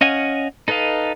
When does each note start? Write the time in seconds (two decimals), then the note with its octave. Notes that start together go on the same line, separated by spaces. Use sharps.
0.01 C#4 D#5 F5 F#5 G#5
0.68 D#4 A4 B4 D#5 F5